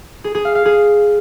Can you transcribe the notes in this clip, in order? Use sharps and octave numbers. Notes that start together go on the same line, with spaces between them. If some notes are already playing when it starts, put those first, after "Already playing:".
G#4
G#4
F5
F5
G#4